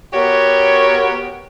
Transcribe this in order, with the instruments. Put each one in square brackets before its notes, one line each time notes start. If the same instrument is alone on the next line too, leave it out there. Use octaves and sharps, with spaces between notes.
[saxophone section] B3 F#4 G4 A#4 C#5